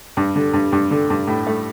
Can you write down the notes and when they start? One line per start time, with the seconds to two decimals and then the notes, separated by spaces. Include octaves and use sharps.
0.17 G2
0.35 D3
0.53 G2
0.72 G2
0.91 D3
1.10 G2
1.27 A2
1.47 A3